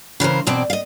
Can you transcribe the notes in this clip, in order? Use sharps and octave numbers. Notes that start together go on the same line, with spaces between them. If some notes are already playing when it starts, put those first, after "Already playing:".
C#3 E3 A#4 C5
E2 B2 C4 C5 D5
D#5 F5